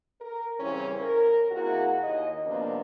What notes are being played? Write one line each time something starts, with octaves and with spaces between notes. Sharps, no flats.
A#4
C#3 E3 G3 C4 C#4
A#4
C3 A#3 E4 F#4 G#4 A#4
D#2 D#5
G2 C3 F3 A#3 B3 D4